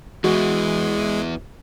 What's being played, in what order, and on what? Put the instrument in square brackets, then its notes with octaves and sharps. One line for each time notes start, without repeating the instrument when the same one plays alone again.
[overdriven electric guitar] E2 E3 [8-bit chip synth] G#3 [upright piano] F#4